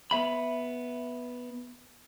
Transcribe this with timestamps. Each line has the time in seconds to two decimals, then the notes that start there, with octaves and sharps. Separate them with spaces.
0.11 B3 E5 B5